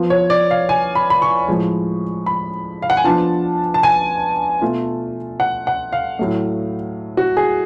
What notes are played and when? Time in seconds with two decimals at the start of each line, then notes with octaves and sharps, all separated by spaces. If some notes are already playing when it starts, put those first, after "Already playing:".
Already playing: F3 B3 F4
0.10 C#5
0.30 D5
0.51 F5
0.69 G#5
0.95 B5
1.10 B5
1.22 C#6
1.48 A2 F3 G#3
2.26 B5
2.82 F5
2.90 F#5
2.97 G#5
3.04 F3 B3 D4 F4 A5
3.74 A5
3.83 G#5
4.62 B2 A3 F4
5.40 F#5
5.67 F#5
5.93 F5
6.19 A2 F#3 A3
7.17 F#4
7.37 G#4